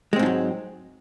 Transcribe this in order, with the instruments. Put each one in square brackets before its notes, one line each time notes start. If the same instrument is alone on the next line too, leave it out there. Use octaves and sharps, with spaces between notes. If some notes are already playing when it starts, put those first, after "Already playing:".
[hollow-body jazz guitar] G#3
C4
G#2
F3
F#3